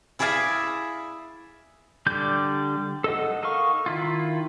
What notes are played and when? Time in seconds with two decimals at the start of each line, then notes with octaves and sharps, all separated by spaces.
0.19 E4 G#4 D5 E5 F5 G#5
2.06 D3 G3 D5 G6
3.04 A4 D#5 F#5
3.43 D#4 A4 A#4 F5 C#6
3.86 D#3 E4 F4